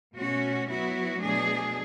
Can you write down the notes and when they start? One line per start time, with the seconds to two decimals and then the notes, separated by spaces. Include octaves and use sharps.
0.15 B2 A3 C#4 F#4
0.68 F#3 B3 E4 F#4
1.22 B2 F#3 A3 D4 G#4